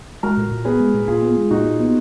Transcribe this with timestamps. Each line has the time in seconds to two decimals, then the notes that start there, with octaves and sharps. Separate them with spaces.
0.23 G#3 F#4 A#4
0.37 A#2
0.51 A#2
0.65 B3 G#4 B4
0.80 G#3
0.94 A#2
1.08 A#2 F4 G#4
1.22 B3
1.37 G#3
1.51 A#2 D#4 F#4
1.65 A#2
1.79 B3